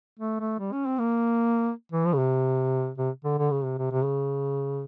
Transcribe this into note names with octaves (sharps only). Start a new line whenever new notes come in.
A3
A3
G3
C#4
C4
A#3
E3
F3
C#3
C3
C3
D3
D3
C#3
C3
C3
C3
C#3